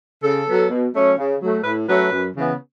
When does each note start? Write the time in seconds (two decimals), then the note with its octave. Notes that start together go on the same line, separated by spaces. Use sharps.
0.23 C#3 A4
0.47 F#3 B3
0.70 B2
0.94 F#3 A3 C#4
1.18 C#3
1.41 F#3 A3
1.64 A2 B4
1.88 F#3 A3 C#4 B4
2.11 F#2
2.35 C#3 E3 B3